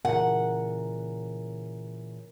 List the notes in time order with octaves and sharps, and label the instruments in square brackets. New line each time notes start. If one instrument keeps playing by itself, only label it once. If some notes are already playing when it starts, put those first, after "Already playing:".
[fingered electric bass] A#2 C#3 E3 [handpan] A#4 [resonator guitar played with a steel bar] F#5